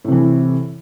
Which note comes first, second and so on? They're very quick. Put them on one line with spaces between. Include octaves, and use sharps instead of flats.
A2 C3 E3